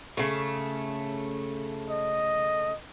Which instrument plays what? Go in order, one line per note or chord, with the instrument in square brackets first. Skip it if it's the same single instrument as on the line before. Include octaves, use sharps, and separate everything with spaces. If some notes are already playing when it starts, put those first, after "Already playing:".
[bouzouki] C#3 A3
[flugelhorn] D#5